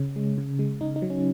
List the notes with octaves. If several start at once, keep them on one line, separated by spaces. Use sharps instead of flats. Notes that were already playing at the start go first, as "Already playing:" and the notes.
Already playing: C#3 C#4
G#3
C#3
G#3
C#3 D#4
D#4
F#3
C#4